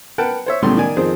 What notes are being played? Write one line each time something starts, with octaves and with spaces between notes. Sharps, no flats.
A#4 B4 F#5 G5 A5
C5 C#5 E5
B1 A2 C#3 G3 A3 C6
D#3 D5 G#5
F2 D#3 G#4 C5